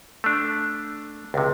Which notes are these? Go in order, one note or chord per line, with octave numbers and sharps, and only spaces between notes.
A3 D4
C#2 C3